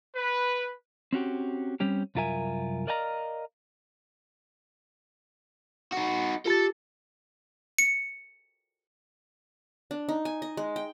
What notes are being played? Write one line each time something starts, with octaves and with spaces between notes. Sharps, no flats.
B4
C4 C#4 F#4 G4
G3 C4 C#4 G4
C2 F#2 F4 A#4 E5 G#5
A#4 D5 D#5 F5 G#5 A#5
D#4 F#4
F4 G4 A4 A5 A6
C#7
D4
D#4
G#5
D#5
G#3
G5